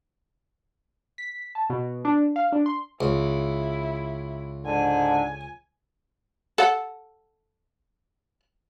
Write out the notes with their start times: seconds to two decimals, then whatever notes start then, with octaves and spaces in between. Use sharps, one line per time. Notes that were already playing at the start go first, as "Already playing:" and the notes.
1.18 B6
1.55 A5
1.70 B2
2.05 D4
2.36 F5
2.52 D4
2.66 C6
3.01 C#2 E4
4.66 G#2 D3 G#5
6.58 A4 F#5